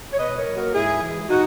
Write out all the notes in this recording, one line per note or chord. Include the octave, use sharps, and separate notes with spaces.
C#5
B2 B4 D#5
A#4 C#5
F#3 A#3
F#4 A#4
G#2 E4 G#4
E3 G#3
A#2 D#4 F#4